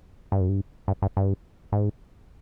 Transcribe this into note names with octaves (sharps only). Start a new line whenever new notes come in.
G2
F#2
G2
G2
G2
G2
G#2